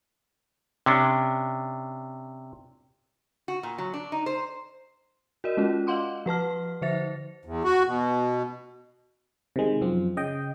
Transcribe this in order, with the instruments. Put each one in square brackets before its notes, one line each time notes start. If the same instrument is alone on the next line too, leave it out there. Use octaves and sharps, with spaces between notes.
[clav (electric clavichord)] C3 C#4 D4
[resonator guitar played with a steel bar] F#4
A#2
F#3
D4
D#4
C5
[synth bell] F#4 A#4 D5 D#5
G#3 C#4 F4
D#5 F5 F#5 C6 D6
F3 B4 A5 F6
D3 F3 C5 E5 A6 A#6
[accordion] E2
F#4
B2
[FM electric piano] C3 D#3 G#3
F#2 F3 C4
C#3 D#5 G5